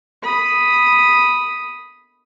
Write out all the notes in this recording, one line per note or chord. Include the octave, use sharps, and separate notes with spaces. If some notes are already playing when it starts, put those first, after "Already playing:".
B5 D#6